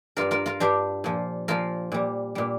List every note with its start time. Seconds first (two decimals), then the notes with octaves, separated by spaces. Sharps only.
0.17 G2 G3 F4 A#4
0.31 F4 A#4
0.46 F4 A#4
0.60 G2 G3 D4 G4
1.04 A#2 F3
1.48 A#2 F3 F4 A#4
1.92 A#2 G3
2.35 A#2 G3